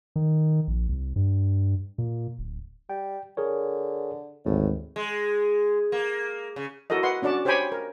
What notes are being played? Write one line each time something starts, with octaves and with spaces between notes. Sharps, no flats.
D#3
A#1
C2
G2
A#2
D1
G3 G5
D3 G#4 A#4 C#5
G#1 D2 A2
G#3
A#3
C#3
E4 F#4 A4 A#4 D#5
B4 D#5 F#5 C6
C#4 D4 F#4 D5 A5
G4 C5 C#5 G5 G#5 B5
A#4